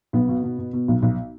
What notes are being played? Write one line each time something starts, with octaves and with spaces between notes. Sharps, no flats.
B1 B3
B2
B2
B2
B2
B1
B1